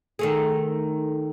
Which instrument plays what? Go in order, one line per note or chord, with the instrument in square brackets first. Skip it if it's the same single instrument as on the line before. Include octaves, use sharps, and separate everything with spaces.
[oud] D#3 A3 G#4